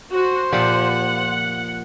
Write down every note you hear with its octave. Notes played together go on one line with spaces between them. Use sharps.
F#4 C5
A#2 F3 G4 F#5